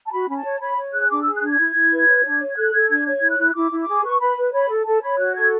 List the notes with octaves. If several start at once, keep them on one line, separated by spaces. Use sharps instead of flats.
A5
F#4 B5
C#4 B5
A5
C#5
C#5 B5
C#5
G#4 F#6
D4 D6
G#4 E6
F#6
D4 G#6
E4
E4
B4
C#5
D4
C#5
A4 F#6
A4 G#6
D4 G#6
C#5 G#6
E4
F#6
E4
E4 D6
E4
D6
G#4
B4 C#6
B4 B5
B4
C#5 B5
A4
A4 A5
C#5 B5
F#4 F#6
A4 G#6